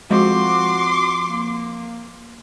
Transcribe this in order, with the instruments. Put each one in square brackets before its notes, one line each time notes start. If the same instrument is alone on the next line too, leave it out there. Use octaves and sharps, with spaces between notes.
[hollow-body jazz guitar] F3 C4 [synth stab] G#3 [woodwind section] F#4 [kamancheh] C6 D6
[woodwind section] A#3